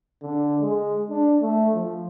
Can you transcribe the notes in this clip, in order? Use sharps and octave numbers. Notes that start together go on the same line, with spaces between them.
D3
G#3
D4
A3
F3